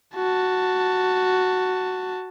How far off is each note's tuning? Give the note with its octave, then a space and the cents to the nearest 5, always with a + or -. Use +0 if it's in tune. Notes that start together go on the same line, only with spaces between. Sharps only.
F#4 +0 A5 +10